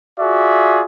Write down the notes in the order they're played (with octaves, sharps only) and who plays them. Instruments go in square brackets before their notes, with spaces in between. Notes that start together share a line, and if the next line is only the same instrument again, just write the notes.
[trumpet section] F4 F#4 G#4 D5 E5